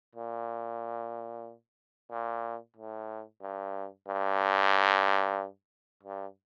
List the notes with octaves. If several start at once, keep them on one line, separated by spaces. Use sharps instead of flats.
A#2
A#2
A2
G2
G2
G2